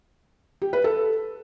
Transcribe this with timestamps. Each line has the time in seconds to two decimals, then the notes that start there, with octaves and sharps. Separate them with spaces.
0.62 G4
0.73 B4
0.84 A4